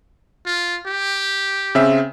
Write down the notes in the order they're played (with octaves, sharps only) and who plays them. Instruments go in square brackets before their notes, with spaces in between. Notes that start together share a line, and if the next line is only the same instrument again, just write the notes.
[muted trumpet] F4
G4
[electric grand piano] C#3 C4 E5